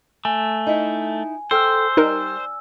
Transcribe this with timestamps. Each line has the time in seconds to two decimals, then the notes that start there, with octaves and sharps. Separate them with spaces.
0.25 A3 G#5
0.67 D#4 E4
1.51 A4 C5 G5 E6 F6
1.97 G3 D#4 A#4